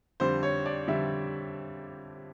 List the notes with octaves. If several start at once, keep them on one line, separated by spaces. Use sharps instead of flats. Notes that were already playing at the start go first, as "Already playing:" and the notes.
F2 D3 G3 C5
C#5
D5
F2 D3 G3 E5